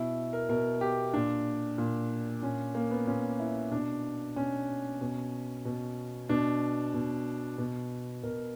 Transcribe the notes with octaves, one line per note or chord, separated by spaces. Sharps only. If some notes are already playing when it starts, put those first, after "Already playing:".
Already playing: B2 E4
A#4
B2 A#4
G4
A#2 D4
A#2
A#2 C#4
A#3
B3
A#2 C#4
E4
B2 D4
B2 C#4
B2
B2
B2 D4
B2
B2
B2 A#4